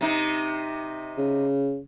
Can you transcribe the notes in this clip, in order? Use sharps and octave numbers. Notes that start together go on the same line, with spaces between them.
C3 D#4
C#3